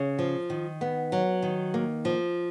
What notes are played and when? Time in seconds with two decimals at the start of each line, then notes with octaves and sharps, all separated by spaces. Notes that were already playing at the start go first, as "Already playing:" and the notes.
Already playing: C#3
0.19 F3
0.50 D#3
0.81 B3
1.12 F#3
1.43 D#3
1.74 A#3
2.05 F3